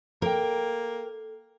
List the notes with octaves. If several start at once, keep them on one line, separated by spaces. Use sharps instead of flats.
A#3 A4 A#4 G5